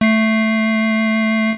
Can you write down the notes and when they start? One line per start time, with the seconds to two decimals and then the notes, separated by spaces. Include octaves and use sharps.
0.01 A3 C7